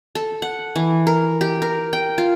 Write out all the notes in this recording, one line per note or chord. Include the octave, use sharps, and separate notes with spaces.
A4
F#5
E3
A#4
G4
A#4
G5
F4